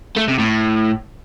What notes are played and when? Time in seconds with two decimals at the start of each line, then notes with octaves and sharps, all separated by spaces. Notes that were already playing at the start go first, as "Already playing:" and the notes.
0.17 A3
0.28 C3
0.39 A2